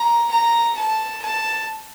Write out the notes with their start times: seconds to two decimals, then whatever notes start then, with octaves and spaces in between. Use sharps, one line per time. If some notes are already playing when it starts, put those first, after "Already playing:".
Already playing: A#5
0.31 A#5
0.76 A5
1.22 A5